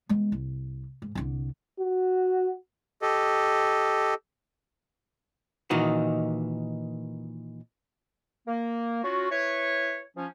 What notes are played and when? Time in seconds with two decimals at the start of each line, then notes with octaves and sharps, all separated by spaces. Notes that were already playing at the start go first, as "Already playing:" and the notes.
0.09 G#3 B3
0.32 C2
1.02 G#2
1.15 C2 D3
1.80 F#4
3.02 G4 A4 D#5
5.70 A#2 D#3 E3 D#4 F#4
8.48 A#3
9.03 C#4 F4 F#4
9.31 E4 B4 C#5
10.17 F3 C#4